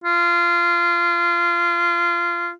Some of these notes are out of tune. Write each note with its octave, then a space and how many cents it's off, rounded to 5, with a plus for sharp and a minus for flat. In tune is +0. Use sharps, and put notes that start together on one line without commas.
F4 -20